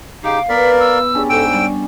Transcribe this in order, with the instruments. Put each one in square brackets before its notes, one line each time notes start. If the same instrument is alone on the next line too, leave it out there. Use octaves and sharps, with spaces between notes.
[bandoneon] C#3 D#4 G4 [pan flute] F5 [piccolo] D6
[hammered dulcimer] B3 [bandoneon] A#4 D5 [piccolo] B6
[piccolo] E6
[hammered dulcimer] C#4 D4 G4 [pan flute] G#4
[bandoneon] G#2 G5 E6 [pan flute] A4 [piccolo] D7
[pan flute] G3